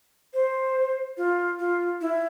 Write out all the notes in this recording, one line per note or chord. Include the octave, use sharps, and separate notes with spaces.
C5
F4
F4
E4